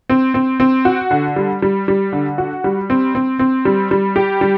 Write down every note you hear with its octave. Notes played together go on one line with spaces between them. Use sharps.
C4
C4
C4
F#4
D3
G3
G3
G3
D3
F#4
G3
C4
C4
C4
G3
G3
G4
G3